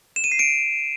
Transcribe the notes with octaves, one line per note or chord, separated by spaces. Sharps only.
E7
D#7
C7
D7